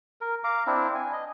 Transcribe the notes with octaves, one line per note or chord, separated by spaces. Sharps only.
A#4
F5 A#5 D6
C4 D4 E4
G#5
D#5